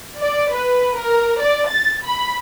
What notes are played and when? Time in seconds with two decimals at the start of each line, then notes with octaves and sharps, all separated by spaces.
0.20 D5
0.53 B4
0.97 A#4
1.41 D5
1.70 A6
2.06 B5